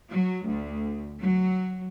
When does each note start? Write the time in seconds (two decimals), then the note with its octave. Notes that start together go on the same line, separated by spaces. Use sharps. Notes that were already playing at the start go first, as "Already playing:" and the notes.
0.10 F#3
0.48 D2
1.22 F#3